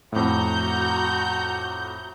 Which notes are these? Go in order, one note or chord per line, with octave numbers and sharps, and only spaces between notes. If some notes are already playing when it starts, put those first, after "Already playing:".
F2 A2 F#4 A#5 G6